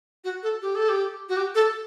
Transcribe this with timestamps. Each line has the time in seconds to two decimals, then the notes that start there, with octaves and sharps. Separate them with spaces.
0.24 F#4
0.43 A4
0.62 G4
0.75 A4
0.89 G4
1.29 F#4
1.37 G4
1.55 A4